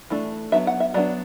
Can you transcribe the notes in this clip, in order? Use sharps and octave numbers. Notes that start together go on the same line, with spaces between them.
E3 A3 D4
F#3 B3 D4 E5
F#5
E5
F#3 B3 D4 D5